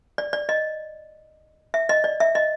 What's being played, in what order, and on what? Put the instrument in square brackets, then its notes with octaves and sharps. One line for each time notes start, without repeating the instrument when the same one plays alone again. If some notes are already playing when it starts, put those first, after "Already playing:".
[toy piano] D5
D5
D#5
E5
D#5
D5
E5
D#5